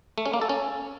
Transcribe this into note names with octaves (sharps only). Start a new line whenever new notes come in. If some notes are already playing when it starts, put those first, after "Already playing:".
A3
C#4
A#3
A4
C#4